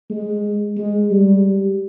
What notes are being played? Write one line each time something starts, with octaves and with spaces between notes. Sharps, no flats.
G#3
G#3
G3